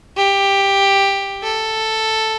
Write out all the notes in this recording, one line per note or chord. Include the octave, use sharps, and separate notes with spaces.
G4
A4